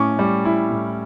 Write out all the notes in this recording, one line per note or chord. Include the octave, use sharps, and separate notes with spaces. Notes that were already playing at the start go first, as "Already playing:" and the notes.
Already playing: A2 C#4 C#6 D6
G3
E4
A2